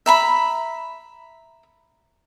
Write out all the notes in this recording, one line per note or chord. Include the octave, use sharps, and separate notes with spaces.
E5 A#5 B5